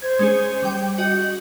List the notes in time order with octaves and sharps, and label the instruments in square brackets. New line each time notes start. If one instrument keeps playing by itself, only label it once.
[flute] C5 [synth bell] G#6
[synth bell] G#3 C#4 G#4
G3 G5
[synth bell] F#4 D#5 [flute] G6